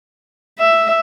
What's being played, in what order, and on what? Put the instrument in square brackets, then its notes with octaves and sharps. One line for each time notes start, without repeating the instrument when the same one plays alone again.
[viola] E5